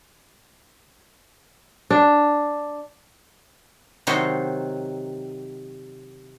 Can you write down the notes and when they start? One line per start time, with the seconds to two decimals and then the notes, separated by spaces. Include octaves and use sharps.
1.90 D4
4.07 C3 D#3 F#3 D#4 F#4 C5